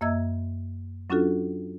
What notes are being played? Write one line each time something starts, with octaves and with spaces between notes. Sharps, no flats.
F#2 A#3 D#5 E5 E6 G#6
F#3 C#4 D4 F4 F#4 A4